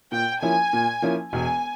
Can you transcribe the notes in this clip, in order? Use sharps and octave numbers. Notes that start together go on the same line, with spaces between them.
A#2 G5
F3 A#3 C#4 E4 G#5
A#2
F3 A#3 C#4 E4
E1 G#5